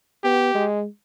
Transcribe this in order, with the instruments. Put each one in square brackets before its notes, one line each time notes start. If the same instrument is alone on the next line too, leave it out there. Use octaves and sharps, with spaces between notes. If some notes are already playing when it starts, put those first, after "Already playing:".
[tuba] B3 [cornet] G4
[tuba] G#3